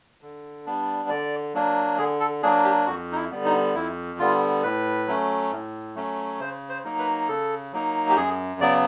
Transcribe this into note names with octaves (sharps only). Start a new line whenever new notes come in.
D3
G3 B3 D4
D3 D5
F#3 A#3 D4
D3 G#4
A4
F#3 A#3 D4 G#4
G4
F2 F#4
D#4
E4
D3 G3 B3
D#4
F2 E4
D3 G3 B3 F4
A2 B4
F#3 A3 C#4
A2
F#3 A3 C#4
C#3 C5
C5
F#3 A#3 D#4
B4
C#3 A4
F#3 A#3 D#4
G4
F#2 G#4
C#3 F#3 B3 D5